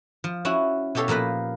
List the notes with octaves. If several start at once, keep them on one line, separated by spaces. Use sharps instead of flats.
F3
C#4 E4 F#4 F#5
B2 B3 G4 A4 C#5 F5
A#2 F3 A#3 B4 B5